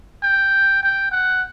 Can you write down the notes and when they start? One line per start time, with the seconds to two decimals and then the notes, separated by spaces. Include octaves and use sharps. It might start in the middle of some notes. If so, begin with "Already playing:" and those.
0.23 G5
0.83 G5
1.12 F#5